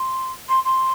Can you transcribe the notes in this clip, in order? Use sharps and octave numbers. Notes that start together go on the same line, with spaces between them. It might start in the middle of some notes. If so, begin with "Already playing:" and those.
Already playing: C6
C6
C6